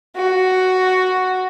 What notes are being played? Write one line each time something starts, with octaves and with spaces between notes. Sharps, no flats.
F#4